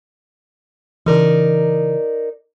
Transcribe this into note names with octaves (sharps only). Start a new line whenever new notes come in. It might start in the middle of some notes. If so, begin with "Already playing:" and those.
C#3 E3 D#4 A#4 D5